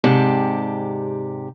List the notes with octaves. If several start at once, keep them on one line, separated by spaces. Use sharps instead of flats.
G#2 C3 G4 D5 A5